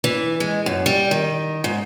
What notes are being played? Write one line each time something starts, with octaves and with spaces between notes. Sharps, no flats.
E3
G#3
F#2
G3
D#3
G#2